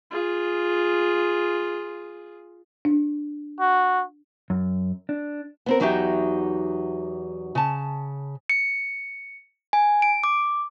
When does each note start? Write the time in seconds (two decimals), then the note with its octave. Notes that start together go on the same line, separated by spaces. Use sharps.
0.11 F4 G#4
2.85 D4
3.60 F#4
4.50 F#2
5.09 D4
5.66 B3 C4 A#4
5.80 E2 F#3 D#4 F#4 G4 E5
7.55 C#3 A5
8.49 C#7
9.73 G#5
10.02 D7
10.24 D6